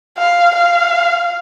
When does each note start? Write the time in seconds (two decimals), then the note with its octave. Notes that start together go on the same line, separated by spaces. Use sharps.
0.18 F5
0.55 F5